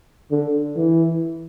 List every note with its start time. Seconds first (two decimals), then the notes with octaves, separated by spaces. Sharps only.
0.31 D3
0.77 E3